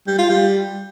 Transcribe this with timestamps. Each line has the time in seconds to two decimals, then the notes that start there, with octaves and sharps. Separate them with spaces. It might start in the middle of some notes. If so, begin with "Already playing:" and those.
0.07 G3
0.18 F4
0.29 G3